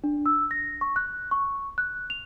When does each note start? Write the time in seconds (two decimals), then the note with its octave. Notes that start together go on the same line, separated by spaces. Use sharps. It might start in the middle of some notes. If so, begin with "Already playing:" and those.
0.04 D4
0.26 E6
0.51 A#6
0.81 C#6
0.96 F#6
1.31 C#6
1.78 F#6
2.10 F7